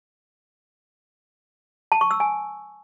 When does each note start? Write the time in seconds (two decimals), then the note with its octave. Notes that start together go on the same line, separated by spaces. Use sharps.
1.92 A5
2.01 C#6
2.11 E6
2.20 G#5